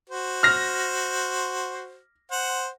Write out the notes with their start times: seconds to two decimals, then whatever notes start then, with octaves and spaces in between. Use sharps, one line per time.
0.10 F#4 C5
0.43 F6 A#6
2.31 C5 F#5